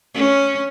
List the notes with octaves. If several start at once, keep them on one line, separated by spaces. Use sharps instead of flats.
C#4